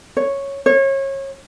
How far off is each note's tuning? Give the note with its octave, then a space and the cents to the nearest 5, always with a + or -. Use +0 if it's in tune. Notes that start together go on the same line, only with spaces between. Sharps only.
C#5 -5
C#5 -30